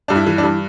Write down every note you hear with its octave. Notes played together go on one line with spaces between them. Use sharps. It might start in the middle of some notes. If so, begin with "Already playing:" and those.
G2 D4
E4
E3
D4
G2